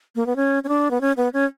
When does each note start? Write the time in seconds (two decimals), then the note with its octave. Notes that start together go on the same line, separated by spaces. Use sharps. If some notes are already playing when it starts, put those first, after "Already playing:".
0.16 A#3
0.26 B3
0.36 C#4
0.64 C#4
0.69 D4
0.91 B3
1.01 C#4
1.17 B3
1.33 C#4